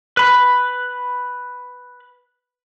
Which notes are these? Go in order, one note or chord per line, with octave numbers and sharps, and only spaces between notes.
B4 B5